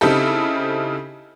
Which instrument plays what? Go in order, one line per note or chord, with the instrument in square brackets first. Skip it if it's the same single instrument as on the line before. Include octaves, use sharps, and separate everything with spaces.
[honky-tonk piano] C#3 C4 D#4 E4 G4 A4